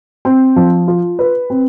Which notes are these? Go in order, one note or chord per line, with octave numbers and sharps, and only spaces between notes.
C4
F3
F4
B4
C4